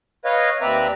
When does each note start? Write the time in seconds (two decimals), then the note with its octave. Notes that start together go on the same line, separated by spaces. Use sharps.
0.25 B4 C#5 D#5 F5
0.61 D#2 C4 B4 D5 E5 A#5